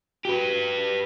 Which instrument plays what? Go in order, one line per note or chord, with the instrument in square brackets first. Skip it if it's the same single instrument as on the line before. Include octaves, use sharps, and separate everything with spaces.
[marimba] F#4 [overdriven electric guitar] G4 B4